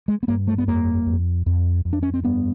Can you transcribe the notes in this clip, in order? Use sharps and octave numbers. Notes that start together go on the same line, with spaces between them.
G#3
B3
G2 A#3
A3
B3
F2 A#3
F2
F2
F2
D4
C#4
C4
G2 B3